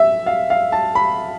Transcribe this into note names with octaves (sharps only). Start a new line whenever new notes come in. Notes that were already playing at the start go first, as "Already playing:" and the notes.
Already playing: E5
F5
F5
A5
B5